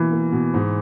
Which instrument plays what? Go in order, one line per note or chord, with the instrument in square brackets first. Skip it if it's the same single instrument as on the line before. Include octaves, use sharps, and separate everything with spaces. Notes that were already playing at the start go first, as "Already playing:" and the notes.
Already playing: [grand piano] B2 A#3 [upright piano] E3
[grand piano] A#3
B2
G#2